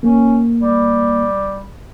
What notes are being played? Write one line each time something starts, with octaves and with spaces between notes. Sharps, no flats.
A#3 C#4
G3